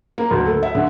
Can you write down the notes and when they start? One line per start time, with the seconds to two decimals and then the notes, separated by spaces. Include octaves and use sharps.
0.18 A#3
0.31 D2
0.46 A4
0.63 E5
0.75 D3